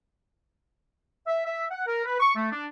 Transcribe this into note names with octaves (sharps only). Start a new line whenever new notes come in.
E5
E5
F#5
A#4
B4
C#6
A3
D4